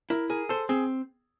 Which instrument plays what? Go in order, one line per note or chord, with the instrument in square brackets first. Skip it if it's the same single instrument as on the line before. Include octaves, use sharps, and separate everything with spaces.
[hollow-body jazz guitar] E4 [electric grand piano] A#4
[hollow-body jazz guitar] G#4 [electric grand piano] A#4
[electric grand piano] A4 [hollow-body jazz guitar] C5
[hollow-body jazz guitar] C4 [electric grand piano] G#4